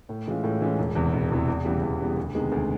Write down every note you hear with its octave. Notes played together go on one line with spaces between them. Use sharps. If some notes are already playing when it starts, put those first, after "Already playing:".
A2
E3 G#3 C#4 F4
A2
E3 G#3 C#4 F4
E1
E2 C3 E3
E1
E2 C3 E3
E2
C#3 E3 G3 B3
E2
C#3 E3 G3 B3
D2
C3 D#3 G#3 B3
D2